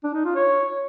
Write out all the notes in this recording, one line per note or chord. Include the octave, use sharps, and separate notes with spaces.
D4
D#4
F4
C#5